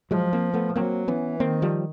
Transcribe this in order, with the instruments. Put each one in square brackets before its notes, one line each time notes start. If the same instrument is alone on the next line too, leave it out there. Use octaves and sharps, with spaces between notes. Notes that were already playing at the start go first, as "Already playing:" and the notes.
[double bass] F3 [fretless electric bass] F#3 G#3
[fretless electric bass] A#3 C4
A3 B3
[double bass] F#3 [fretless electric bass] A#3 C4
[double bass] E3 [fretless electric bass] B3 C#4
[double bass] D#3 [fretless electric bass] A#3 C4
[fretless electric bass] F3 G3